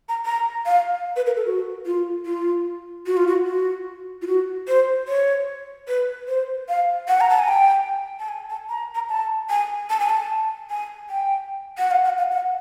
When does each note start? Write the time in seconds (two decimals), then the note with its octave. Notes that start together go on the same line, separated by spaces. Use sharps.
0.09 A#5
0.25 A#5
0.66 F5
1.16 B4
1.26 A#4
1.36 A4
1.46 F#4
1.86 F4
2.26 F4
3.06 F#4
3.17 F4
3.27 F#4
3.47 F#4
4.22 F4
4.27 F#4
4.68 C5
5.08 C#5
5.88 B4
6.28 C5
6.69 F5
7.08 F#5
7.21 A#5
7.30 A5
7.39 G#5
7.48 G5
8.20 A5
8.29 G#5
8.50 A5
8.69 A#5
8.95 A#5
9.09 A5
9.50 G#5
9.90 A5
10.00 G#5
10.10 A5
10.70 G#5
11.10 G5
11.78 F#5
11.91 F5
12.04 F#5
12.18 F5
12.31 F#5